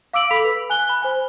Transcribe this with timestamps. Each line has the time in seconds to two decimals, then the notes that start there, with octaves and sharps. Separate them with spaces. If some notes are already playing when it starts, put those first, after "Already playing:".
0.13 F5 D6 E6 D7 F#7
0.31 A4 B5 B6 F7
0.44 B4
0.70 G#5 F#6 G7
0.89 B5
1.02 C5 G#5